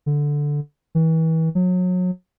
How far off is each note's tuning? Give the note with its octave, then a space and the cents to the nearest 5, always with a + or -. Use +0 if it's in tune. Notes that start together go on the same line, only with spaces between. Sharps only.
D3 -5
E3 -35
F#3 -30